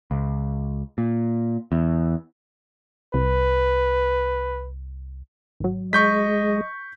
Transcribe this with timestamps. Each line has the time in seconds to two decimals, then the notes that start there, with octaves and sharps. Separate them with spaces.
0.11 C#2
0.98 A#2
1.72 E2
3.14 C2 B4
5.60 G#1 F#3
5.93 G#3 D#5 C#6 G6 B6